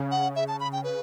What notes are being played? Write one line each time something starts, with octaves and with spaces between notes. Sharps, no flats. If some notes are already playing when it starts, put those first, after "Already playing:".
Already playing: C#3
F#5
E5
A5
B5
G5
B4